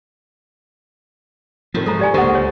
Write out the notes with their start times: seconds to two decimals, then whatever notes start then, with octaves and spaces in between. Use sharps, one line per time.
1.74 A2 C3 D#3 F3
1.86 G#2 C#3 G#3 A4 A#5
1.99 G4 D5 G#5
2.14 C#2 D3 A#3 G4 A4 C5 F#5
2.35 C#5